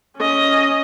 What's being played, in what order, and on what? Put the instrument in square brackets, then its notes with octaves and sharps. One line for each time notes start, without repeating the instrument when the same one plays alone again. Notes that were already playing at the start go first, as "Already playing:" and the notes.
[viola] C#4 D#5